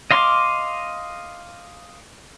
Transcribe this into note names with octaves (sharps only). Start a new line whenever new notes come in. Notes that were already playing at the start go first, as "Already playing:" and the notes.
D#5 F5 C6 D6